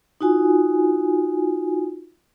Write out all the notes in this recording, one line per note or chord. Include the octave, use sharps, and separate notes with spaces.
D#4 F4 F#4 G#5